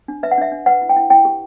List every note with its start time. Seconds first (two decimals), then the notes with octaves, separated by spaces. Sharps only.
0.08 D4
0.23 B4 E5
0.31 F#5
0.38 D4 E5
0.52 D4
0.66 B4 F#5
0.82 E4
0.89 G5
0.96 E4
1.10 E4 G5
1.25 G4